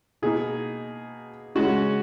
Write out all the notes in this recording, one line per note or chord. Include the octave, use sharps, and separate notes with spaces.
B2 A#3 D#4 G#4
C#3 G#3 C#4 F#4